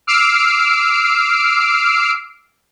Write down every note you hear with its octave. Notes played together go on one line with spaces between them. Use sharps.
D6 E6 F6 C7 D7